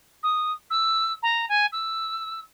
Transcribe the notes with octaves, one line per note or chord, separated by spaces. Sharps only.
D#6
E6
A#5
G#5
E6